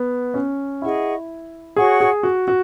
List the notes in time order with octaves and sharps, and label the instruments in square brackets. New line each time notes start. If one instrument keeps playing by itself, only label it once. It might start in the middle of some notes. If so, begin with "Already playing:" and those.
Already playing: [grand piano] B3
C#4
[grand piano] E4 [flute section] G#4 D#5 F#5 C#6
[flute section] F#4 C#5 F#5 C#6 [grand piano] G#4
[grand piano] G#4
F#4
F#4